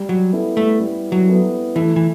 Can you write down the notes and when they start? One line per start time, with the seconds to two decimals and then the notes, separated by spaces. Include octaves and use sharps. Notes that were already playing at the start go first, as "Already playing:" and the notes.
Already playing: G3
0.09 F#3
0.33 B3 E4 A4
0.57 A3
0.80 G3
1.12 F#3
1.28 B3 E4 A4
1.75 E3 A3
1.96 E3